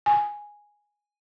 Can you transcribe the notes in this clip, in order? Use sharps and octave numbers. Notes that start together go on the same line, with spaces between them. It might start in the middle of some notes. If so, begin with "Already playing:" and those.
G#5